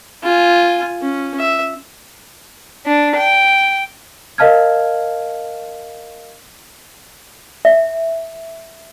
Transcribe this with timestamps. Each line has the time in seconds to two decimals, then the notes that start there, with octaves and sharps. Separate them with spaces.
0.23 F4 G#5
1.02 C#4
1.39 E5
2.86 D4
3.17 G5
4.38 A#4 D#5 F5 A5 F6 G#6
7.65 E5